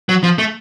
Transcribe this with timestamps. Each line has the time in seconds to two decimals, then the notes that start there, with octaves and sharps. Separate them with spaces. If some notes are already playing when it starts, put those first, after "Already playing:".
0.09 F#3
0.23 F3
0.38 A3